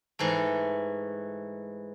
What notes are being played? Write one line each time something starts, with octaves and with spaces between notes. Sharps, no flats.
G#2 E3 A3